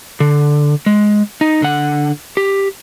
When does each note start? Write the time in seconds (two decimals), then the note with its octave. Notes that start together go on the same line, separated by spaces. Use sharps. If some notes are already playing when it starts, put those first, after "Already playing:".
0.20 D3
0.86 G#3
1.41 D#4
1.62 D3 F#5
2.37 G4